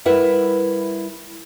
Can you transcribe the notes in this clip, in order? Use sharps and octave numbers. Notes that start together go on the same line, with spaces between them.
G3 E4 A#4 B4 E5 F#5